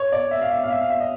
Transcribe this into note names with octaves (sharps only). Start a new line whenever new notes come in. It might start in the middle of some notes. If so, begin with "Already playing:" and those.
Already playing: C#5
D5
E5
F5
E5
F5
E5
F5
E5
D#5